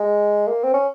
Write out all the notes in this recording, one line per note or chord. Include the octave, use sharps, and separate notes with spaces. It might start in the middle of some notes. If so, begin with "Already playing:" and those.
Already playing: G#3
A#3
C4
C#4